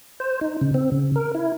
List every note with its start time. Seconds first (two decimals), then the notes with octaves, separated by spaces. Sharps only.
0.20 C5
0.41 D#4
0.61 C#3
0.74 C4
0.92 C#3
1.16 A#4
1.35 E4